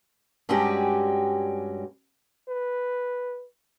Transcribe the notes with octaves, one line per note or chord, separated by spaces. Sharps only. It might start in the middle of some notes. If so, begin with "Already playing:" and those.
G2 G3 G#3 C#4 F#4 G4
B4